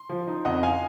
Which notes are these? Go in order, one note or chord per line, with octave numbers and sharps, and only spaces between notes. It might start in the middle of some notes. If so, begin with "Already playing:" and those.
Already playing: C6
F3
D#4
F2 D#5 F#5
F5 G#5